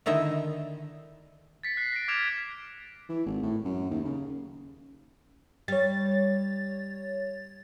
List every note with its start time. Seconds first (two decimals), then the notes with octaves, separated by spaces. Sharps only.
0.06 D3 D#3 E4 D#5 E5
1.63 A6 B6 C#7
1.77 F#6 C7
1.93 A#6 D7
2.08 D6 F6 G#6 D7 E7 F7
3.09 E3
3.26 G#1
3.42 A2
3.65 F#2
3.90 D#2
4.05 C#3
5.68 G3 C#5 A6